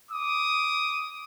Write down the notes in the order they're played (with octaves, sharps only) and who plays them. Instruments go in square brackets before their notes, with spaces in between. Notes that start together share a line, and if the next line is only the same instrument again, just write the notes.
[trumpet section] D6 D#6